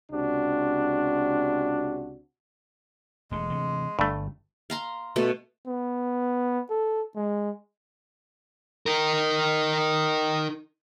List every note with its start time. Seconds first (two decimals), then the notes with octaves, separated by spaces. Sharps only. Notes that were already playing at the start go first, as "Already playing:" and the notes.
0.12 C#2 C3 D4 F#4
3.31 E1 G#3 A3
3.50 C3 E3 A3
3.99 G1 G2 A3
4.70 F5 A#5 C6
5.16 B2 A3 A4
5.67 B3
6.70 A4
7.16 G#3
8.86 D#4 A#4